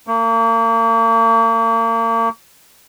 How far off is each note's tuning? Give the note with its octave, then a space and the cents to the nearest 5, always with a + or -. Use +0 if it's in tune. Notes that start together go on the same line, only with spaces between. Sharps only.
A#3 -40